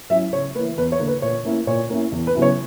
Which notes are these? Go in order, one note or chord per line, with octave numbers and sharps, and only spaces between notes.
F#3 C#4 E4 E5
C#3 C#5
E3 A#3 B4
E2 B4
C#5
D3 A#3
B4
A#2 C#5
A#3 C#4 E4
A#2 C#5
A#3 C#4 E4
E2
B4
C#3 F#3 B3 E4
C#5